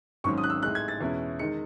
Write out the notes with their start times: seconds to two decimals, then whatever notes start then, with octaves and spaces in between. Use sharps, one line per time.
0.24 G#1 G#2 F#3 C#4 C#6
0.38 D#6
0.43 F#6
0.50 E6
0.63 A2 G#3 D#4 F#6
0.75 G#6
0.88 A6
1.01 E2 B2 G#3 C#4 E4
1.39 D#3 G#3 D#4 C#7